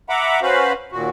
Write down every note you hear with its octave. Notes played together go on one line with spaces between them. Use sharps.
E5 F#5 A#5 B5 D6
C#4 F#4 B4 C5 F5 B5
D#2 A#2 F#4